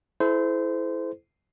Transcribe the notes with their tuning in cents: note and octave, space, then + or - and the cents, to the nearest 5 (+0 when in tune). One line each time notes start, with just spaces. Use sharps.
E4 +0 A4 -35 C5 -25